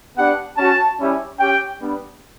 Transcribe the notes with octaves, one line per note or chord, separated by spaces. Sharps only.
B3 D4 G4 F#5
C#4 F#4 A5
G3 C#4 E4 G4
C#4 G4 G5
G3 B3 D4